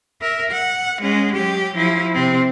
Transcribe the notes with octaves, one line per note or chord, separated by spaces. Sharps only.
A#4 E5
F#5
G#3 C#4
F#3 G4
F3 E4
C3 C4